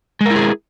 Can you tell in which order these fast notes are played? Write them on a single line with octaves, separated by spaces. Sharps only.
G#3 A#4 E4 G#4